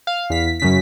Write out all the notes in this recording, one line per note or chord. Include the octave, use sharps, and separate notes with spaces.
F5
E2 B6
F#2 C#3 B6